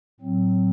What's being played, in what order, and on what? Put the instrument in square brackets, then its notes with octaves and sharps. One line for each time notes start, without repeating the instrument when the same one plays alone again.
[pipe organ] A2 F#3 C4